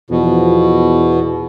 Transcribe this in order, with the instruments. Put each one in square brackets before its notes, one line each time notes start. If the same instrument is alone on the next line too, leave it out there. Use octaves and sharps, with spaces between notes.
[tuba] E2 [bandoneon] B2 [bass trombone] F3